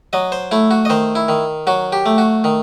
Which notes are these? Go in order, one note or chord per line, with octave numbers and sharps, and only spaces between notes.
F#3 D#5
C5
A3 E4
F#4
D#5
D#3 C5
E4
D#3
F#3 F#4
G4
A3
F#4
D#3